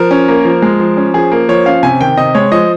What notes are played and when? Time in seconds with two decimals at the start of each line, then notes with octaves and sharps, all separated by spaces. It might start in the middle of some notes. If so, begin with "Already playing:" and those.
Already playing: F3 A#4
0.11 C#4
0.28 A#3
0.45 F3
0.62 G#3
0.80 F3
0.97 C#4
1.14 F3 G#4
1.32 A#3
1.49 F3 C#5
1.66 C#4 F5
1.83 C3 G#5
2.01 D#3 G5
2.17 C3 D#5
2.35 G#3 C#5
2.52 F3 D#5